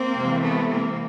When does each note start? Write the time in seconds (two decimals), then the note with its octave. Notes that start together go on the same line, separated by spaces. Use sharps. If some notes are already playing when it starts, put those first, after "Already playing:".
Already playing: A#3 C4
0.15 C3 E3 G#3
0.42 A3 B3
0.70 A#3 C4